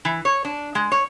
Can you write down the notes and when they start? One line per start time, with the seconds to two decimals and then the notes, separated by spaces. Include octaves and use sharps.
0.05 E3
0.25 C#5
0.45 D4
0.75 G#3
0.92 C#5